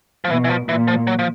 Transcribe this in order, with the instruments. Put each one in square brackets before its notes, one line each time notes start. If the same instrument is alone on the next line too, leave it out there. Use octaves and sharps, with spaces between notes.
[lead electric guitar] F3
[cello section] B2 [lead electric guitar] E3
[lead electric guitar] E3
F3
[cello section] A#2 [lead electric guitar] E3
[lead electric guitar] F3
F#3
F3